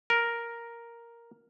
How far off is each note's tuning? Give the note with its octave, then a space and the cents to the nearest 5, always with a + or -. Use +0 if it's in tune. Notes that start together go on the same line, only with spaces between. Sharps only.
A#4 +5